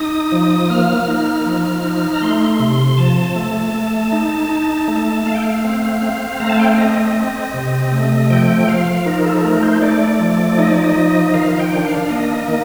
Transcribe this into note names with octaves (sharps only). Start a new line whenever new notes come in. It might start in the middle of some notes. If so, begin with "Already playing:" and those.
Already playing: D#4 D#6
F3
A#3 F6
D#4
F3
D#4
A#5
A3 C6
C3
F3 A5
A3
A3
D#4
D#4
A3
A3 F5
G5
F5
C4
C4 F5
A3 A#5
A5
G5
F5
C4 D#5
C4
C3
A3
F3 G5
F3 F5
D#4 A#4
A4
A3 A#4
C5
A3 D5
F3
D#4 D#5
D5
D#5
F3
D#3 F5
G5
D4
F5
A#3 D#5
D#3